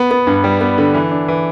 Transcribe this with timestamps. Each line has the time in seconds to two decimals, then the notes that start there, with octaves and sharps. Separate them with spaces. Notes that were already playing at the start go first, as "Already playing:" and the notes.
Already playing: B3
0.11 B3
0.27 G2
0.44 G3
0.61 B3
0.78 D3
0.94 E3
1.11 D4
1.28 E3